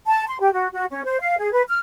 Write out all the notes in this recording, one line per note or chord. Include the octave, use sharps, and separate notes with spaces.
A5
C6
G4
F#4
F#4
C#4
C5
F5
G#4
B4
F6